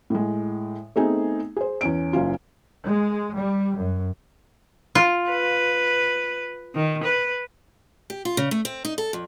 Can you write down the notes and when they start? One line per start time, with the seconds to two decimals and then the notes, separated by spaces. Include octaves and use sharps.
0.10 A2 G#3
0.96 A3 B3 C4 D#4 G#4
1.56 G#4 C5
1.81 E2 C#4 D7
2.13 F#1 C#4 F4
2.84 G#3
3.35 G3
3.77 F#2
4.95 F4
5.30 B4
6.75 D#3
7.04 B4
8.10 G4
8.25 F4
8.37 C#3
8.51 A3
8.65 C4
8.85 D#4
8.98 A4
9.13 F2